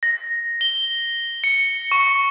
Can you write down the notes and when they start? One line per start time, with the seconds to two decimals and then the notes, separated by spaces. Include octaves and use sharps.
0.03 A#6
0.61 G7
1.44 C#7
1.92 C#6